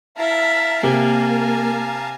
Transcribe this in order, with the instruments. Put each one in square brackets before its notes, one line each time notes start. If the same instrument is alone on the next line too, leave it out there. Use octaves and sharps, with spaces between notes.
[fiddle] E4 E5 [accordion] F5 A5 A#5
[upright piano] C3 [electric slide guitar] A#3 [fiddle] G#5